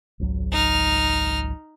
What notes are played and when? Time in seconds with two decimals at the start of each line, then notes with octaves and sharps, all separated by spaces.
0.20 G#1 C#2 F#3
0.52 D#4 F6